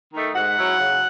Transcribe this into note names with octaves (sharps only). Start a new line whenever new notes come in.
D#3 A3 D#4
G#2 F#5
F#3 C#4 E4
C#3